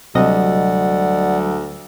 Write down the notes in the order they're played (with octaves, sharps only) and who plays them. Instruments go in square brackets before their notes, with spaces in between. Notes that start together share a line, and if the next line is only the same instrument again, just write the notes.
[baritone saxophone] D2 [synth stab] C3 D#5 [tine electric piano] F#3 G3 [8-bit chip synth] D5 F#5